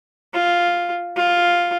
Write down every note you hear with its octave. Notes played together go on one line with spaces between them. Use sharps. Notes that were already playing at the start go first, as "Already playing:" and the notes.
F4
F4